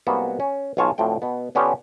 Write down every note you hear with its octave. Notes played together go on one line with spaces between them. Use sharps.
C2 G#3 A#3 B3 F#4
C#4
B1 B3 F4 C#5 G#5 A5
D2 A2 F3 C4 G5
B2 B3
D3 B3 C#4 D4 F4 G4